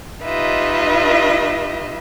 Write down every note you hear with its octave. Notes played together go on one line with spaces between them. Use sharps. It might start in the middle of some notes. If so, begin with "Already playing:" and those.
D#4 F4 G4 B4 D#5 E5